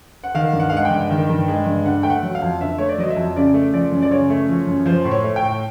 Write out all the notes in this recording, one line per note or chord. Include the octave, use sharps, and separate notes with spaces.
F#5
D#3 F5
G2
F#5
F5
G#3 F#5
G5
G2
D#3
G2
G#3
G2
D3 F#5
A3 G5
F#5
F#3
F5
F2
D3 E5
A3 C#5
D5
F#3 D#5
E5
F2
C#3 D5
A3
F3 D5
F#2
D5
C#3 C#5
A3
F3
F#2
F3 C5
A2
C#5
A3
G5
A2